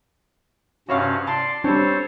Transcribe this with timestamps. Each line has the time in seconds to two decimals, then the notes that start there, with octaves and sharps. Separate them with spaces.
0.89 G2 C3 C#4 F#4 C#5 F5
1.27 D5 A5 C6
1.64 G3 C4 D4 A4 C5 C#5